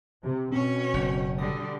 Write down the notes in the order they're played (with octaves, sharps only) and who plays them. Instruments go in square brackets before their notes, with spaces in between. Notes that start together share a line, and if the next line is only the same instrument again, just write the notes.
[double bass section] C3
[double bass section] B2 [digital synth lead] C4 [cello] C#4 C#5
[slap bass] F#1
[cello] D3 G3 [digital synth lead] D#6